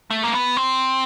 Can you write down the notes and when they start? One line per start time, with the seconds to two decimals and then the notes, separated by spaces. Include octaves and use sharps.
0.10 A3
0.24 A#3
0.34 B3
0.57 C4